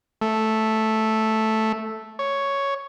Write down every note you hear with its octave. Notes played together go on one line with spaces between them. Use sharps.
A3
C#5